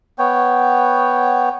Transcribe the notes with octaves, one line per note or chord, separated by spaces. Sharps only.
B3 C#5 G5